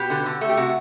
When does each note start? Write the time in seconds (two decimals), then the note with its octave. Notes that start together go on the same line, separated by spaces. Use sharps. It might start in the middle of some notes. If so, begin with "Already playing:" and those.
Already playing: B2 G4
0.10 D3
0.26 D3
0.41 A3
0.49 G4
0.57 C3 F#4